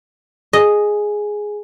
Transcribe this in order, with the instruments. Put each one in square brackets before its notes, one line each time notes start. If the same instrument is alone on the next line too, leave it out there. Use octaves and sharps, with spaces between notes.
[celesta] G#4 G#5 [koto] D#5